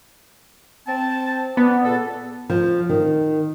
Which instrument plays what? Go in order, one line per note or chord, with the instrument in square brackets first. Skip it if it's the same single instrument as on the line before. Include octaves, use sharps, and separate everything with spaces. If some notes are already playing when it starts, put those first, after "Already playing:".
[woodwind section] C4 A5
[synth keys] B3 [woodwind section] D5
[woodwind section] C#2 A#2 A4
[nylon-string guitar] F3
D#3